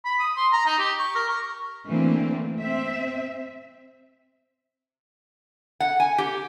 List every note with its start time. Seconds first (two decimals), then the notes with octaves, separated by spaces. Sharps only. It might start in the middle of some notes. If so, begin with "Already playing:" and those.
0.05 B5
0.19 D#6
0.36 C6
0.53 A#5
0.66 D#4
0.78 G4
0.99 C#6
1.15 A#4
1.29 C#6
1.86 D3 E3 A3 A#3 C4
2.61 C4 E5
5.80 F#5
6.00 G#5
6.18 G4